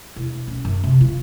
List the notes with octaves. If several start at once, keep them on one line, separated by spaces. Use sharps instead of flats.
E1
C#4
F#2
C3
F4